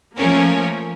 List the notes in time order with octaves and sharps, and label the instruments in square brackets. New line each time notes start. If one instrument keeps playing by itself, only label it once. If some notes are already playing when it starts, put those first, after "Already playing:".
[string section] F3 A3 A#3 C#4 A#4